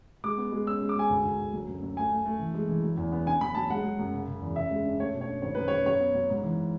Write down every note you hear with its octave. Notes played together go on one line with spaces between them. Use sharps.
G#3 D6
B3
G#3
C#4 E6
G#3
D6
G#3 G#5
D2
D2
D2
F#3
F#2
F#3
A3 G#5
A3
A3
E3
G#3
E3
F#3
E2
B3
D3 G#5
F#3 B5
F#3 A5
G#3 F#5
G#3
F#2
C#3
C#3
E2
C#3 E5
G#3
D4
A3 C#5
B2
C#5
D4
G#1 C#5
F#2 B4
C#5
F#2
F#3 C#5
B3
F#3
G#2
E3